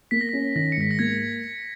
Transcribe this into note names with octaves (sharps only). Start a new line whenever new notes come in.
A#3 B6
A#6
C#4 B6
D#3 A#6
C#7
G#2 B6
A#6
A#3 G#6